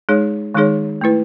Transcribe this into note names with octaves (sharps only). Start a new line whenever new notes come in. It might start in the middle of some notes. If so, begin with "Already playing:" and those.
G#3 D#4 G#4 C#5
D#3 G#3 D#4 G#4 C#5
A3 E4 B4